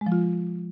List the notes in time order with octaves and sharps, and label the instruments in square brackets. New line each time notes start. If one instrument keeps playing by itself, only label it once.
[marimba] G#3
F3
F4